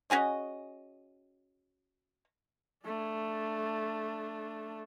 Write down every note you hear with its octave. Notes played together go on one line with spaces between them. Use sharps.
C#4 F#4 G#4 D#5
A3 D4